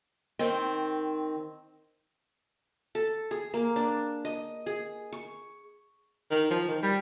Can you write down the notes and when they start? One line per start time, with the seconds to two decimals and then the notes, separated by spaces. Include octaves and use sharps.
0.39 D#3 C4
2.95 A4
3.31 G#4
3.54 A#3
3.76 D4
4.25 D#5
4.66 G#4
5.12 C#6
6.31 D#3
6.50 F3
6.68 D#3
6.83 G3